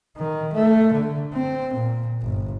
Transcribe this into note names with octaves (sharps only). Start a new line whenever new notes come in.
D#3
A3
D3
C4
A#2
G1